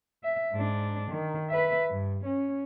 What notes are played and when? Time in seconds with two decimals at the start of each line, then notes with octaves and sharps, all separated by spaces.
0.23 E5
0.53 G#2 D4
1.12 D#3
1.49 B4 E5
1.90 G2
2.25 C#4